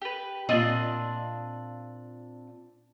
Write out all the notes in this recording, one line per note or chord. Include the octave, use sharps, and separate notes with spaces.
G4 B4
A#2 C4 D4 F4 D#5